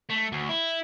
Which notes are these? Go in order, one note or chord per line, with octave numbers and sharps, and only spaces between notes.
A3
D2
E4